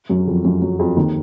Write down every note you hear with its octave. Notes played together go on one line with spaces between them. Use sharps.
F#2 F#3
F2 F3
F#2 F#3
F#2 F#3
F2 F3
D#2 D#3